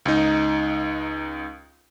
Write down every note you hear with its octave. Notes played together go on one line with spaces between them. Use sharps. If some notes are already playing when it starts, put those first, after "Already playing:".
C#2 D#4